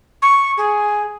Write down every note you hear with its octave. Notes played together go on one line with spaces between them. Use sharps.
C#6
G#4